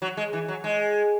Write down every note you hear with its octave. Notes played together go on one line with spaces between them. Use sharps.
F#3
G#3
E3
F#3
G#3